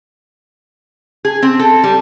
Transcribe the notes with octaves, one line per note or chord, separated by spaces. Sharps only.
G#4
C4
A4
G3